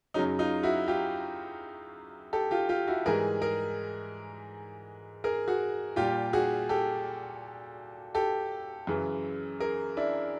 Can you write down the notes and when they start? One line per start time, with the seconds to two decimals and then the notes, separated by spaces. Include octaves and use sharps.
0.14 F#2 C#3 F#3 C#4 D#4
0.39 D#4 F4
0.63 E4 F#4
0.88 F4 G4
2.33 G4 A4
2.51 F4 G4
2.69 F4 G4
2.88 E4 F#4
3.06 G#2 E3 G3 G#4 A#4
3.42 G#4 A#4
5.24 G#4 A#4
5.48 F#4 G#4
5.96 A#2 G3 F4 G4
6.33 F#4 G#4
6.69 G4 A4
8.15 G4 A4
8.87 F#2 C#3 E3
9.60 G#4 A#4
9.97 D4 E4